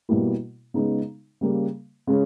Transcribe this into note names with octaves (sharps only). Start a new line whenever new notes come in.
B2 G3 A#3 E4
C#3 G#3 B3 D#4
C#3 G3 A#3
C#3 G#3 C#4